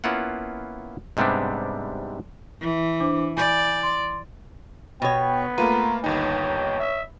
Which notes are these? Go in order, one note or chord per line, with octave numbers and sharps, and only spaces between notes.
A#3 B3 C#4 E4 F4 F#5
G#2 C3 G3 B3 C4 D4
E3
D4 C5 D6
D5 G#5 B5 G6
C6
B2 B3 C#5 G5
A3 A#3 F4 B4 A#5
G1 D#2 D#4 C#5 G5
E5